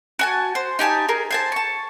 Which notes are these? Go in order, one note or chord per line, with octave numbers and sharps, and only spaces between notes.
F#4 G#5 A5
C5
D#4 G4 G#5 A5
G#4 A#4
C5 G#5 A5
A5 C#6